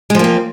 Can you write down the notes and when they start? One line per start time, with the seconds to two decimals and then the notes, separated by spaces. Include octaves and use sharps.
0.10 G#3
0.15 F3
0.19 A#3
0.24 C4